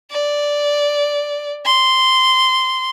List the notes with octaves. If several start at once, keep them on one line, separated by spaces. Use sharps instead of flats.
D5
C6